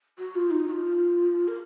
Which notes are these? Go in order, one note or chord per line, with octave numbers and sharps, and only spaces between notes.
F#4
F4
D#4
F#4
F4
A#4